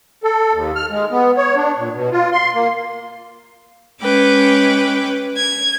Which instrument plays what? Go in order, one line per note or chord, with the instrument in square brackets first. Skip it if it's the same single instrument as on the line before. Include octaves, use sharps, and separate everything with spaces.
[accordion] A4
D#2
F6
G#3
B3
C#5
D4
A#2
B2
F4
C6
A#3
[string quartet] G#3 C#4 B4 G5 D6
G#6